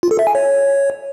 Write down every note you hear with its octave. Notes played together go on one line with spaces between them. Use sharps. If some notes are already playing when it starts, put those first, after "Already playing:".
F4
A4
E5
G#5
C#5